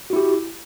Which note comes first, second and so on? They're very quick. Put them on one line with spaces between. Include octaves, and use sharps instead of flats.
F#4 E4 G4